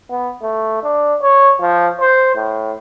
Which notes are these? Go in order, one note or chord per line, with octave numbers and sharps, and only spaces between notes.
B3
A3
D4
C#5
F3
C5
A2